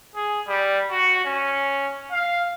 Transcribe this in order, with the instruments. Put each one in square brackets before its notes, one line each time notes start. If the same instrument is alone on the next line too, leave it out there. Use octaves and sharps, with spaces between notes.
[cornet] G#4
G3
F#4
C#4
F5